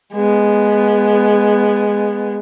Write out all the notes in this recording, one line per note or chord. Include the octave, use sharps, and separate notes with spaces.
G#3 B3